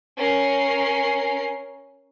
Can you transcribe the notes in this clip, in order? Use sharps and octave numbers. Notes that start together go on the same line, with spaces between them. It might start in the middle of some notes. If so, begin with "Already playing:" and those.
C#4 A#4 C7